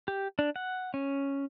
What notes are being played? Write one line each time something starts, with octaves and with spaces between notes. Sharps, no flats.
G4
D4
F#5
C#4